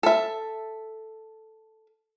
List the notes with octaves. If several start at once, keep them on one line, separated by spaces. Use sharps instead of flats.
A4 E5